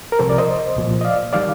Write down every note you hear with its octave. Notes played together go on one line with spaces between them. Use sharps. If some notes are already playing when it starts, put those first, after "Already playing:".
A#4
C2 C3 F3 A4 C5
A#4 D5
C5 D#5
C2 A#2 F3
D#5
D5 F5
D#3 G3 D5 F5